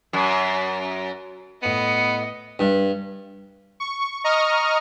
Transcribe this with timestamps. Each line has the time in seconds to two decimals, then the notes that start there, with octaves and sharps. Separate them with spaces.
0.13 F#2
1.63 A2 B3 D#5 C#7 D#7
2.59 G2
3.80 C#6
4.24 D#5 A#5 C#6 D#6 F6